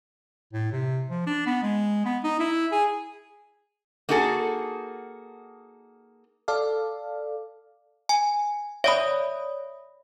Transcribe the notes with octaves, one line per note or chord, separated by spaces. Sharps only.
A2
C3
F3
D4
B3
G#3
B3
D#4
E4
G#4
A#3 D#4 F#4 G#4 A4
A4 D5 F5
G#5
C#5 D5 E5 B5 D#6